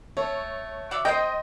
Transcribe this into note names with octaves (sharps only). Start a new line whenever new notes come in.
A3 C#5
F#4 D5 E5
C5 D#5 G5